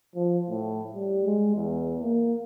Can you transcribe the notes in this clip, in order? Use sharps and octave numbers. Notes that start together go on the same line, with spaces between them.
F3
A2
G3
G#3
E2
A#3